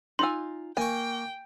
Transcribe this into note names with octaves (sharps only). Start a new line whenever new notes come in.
D#4 F4 G#5 C6 E6
A#3 G5 G#5 C#6